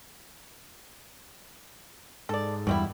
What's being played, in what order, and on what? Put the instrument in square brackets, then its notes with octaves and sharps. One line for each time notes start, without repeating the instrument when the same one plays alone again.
[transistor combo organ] G#2 [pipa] A4 D5
[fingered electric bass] E2 G2 [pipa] F#3 G3 E4